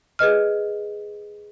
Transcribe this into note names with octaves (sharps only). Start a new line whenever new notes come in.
G#4 B4 D#5 F6